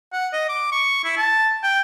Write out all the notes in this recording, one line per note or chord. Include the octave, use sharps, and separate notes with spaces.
F#5
D#5
D6
C#6
E4
A5
G5